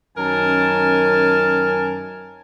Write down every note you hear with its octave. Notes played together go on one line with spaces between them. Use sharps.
F#2 D#3 C#4 A#4 G#5 A5